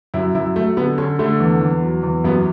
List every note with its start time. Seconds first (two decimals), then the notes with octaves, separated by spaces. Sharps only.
0.14 F#2 E4
0.35 F#2 E4
0.56 F#3 A3
0.77 D3 B3
0.98 D3 C#4
1.19 D3 A3
1.40 E2
1.61 E2
1.82 F#3
2.03 E2
2.24 F#2 B3